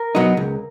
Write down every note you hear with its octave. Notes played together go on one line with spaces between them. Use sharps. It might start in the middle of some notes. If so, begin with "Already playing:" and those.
Already playing: A#4
B2 F#3 B3 D#4
C#2